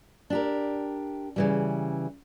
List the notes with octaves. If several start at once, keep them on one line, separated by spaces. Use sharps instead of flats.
D4 G4 A#4
C#3 E3 G3